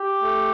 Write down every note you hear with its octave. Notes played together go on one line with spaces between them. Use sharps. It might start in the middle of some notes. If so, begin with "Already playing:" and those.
Already playing: G4
A3